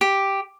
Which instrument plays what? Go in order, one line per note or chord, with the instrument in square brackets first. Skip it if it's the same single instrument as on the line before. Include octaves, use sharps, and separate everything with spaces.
[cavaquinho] G4